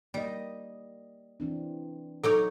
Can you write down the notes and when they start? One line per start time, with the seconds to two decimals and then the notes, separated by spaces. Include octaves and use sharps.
0.14 G3 A#3 D#5
1.40 E3 C4 D4
2.23 F#3 D#4 A4 C#5 D6